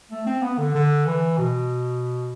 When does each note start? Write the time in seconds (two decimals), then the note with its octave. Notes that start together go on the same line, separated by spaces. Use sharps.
0.11 A3
0.26 C4
0.42 B3
0.58 D3
0.75 D3
1.06 E3
1.38 B2